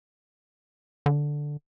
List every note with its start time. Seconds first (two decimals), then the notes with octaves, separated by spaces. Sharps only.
1.06 D3